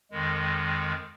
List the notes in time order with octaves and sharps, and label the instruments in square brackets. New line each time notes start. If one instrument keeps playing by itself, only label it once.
[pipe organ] F2 D#3 G#3